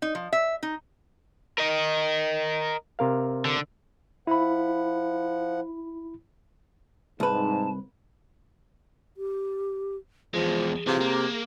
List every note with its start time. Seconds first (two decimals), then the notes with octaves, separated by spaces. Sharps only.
0.02 D#4
0.15 F3
0.33 E5
0.63 D#4
1.58 A#4 D#5
2.99 C3 A#4 F5
3.45 D3
4.27 F3 E4 F#5 B5
7.20 C2 G#2 B4 A5
9.17 G4
10.34 E2 F3 G#3 G#4
10.87 C3 E3 F4
11.01 A#3